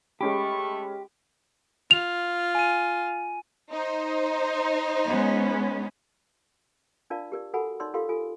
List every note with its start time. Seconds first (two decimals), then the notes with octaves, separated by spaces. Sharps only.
0.21 G#3 A3 C#4 G4 B5 C#6
1.91 F4 F7
2.55 G#5 D#7
3.71 D#4 C5
5.05 G#3 B3 C#4
7.10 D4 F4 A#4 D5 F5 A5
7.32 G4 A#4 D5
7.54 F#4 A4 A#4 F#5 G#5 B5
7.80 D#4 C#5 D5 C6 E6
7.94 F4 G4 A4 A#4 F5 C6
8.09 F4 A4 G#5